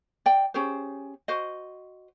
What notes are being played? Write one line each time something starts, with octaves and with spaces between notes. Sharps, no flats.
D5 G5
C#4 G4 G#4 C5
F#4 C5 D#5